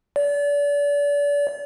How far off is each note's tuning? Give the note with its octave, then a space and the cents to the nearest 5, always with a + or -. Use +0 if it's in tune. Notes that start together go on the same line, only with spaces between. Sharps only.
D5 -35